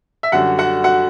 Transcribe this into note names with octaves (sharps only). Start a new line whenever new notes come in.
E5
F#2 D3 G3 F#4 F#5
F#4 F#5
F#4 F#5